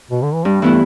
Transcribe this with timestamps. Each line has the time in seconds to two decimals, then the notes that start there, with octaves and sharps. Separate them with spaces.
0.11 B2
0.22 D3
0.34 E3
0.45 G2 G3
0.62 E3 A3 B3 E4